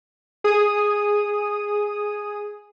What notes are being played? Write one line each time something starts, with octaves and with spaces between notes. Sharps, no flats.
G#4 D#6